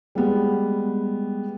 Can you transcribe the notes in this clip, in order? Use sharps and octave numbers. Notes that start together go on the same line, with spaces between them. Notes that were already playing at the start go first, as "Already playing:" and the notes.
G3 G#3 B3